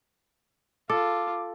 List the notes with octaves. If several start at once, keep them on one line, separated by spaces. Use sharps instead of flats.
F4 A4 D6